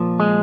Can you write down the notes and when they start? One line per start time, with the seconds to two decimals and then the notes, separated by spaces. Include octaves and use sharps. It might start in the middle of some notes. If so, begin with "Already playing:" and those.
Already playing: A#2 F3
0.20 G#3